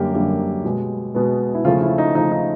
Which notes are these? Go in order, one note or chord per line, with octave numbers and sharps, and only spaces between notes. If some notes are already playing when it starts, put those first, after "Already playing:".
Already playing: F#2 D3 G3 A#3 G4
F#2 D3 G3 A#3
B2 G#3 B3
B2 G#3 B3
E4
C#3 F3 A3 F4
E4
D#4
C#3 F3 A3 D#4
D#4